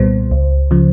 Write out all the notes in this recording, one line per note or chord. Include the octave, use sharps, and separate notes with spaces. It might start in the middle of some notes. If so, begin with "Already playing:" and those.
Already playing: C2 A#2 G3 B3 C5
C#2
C#3 F3